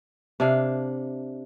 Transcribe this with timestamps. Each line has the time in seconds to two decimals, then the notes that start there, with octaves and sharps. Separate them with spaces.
0.40 C3 D4 F5